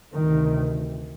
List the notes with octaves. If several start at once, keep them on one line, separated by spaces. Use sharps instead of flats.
D2 C3 D#3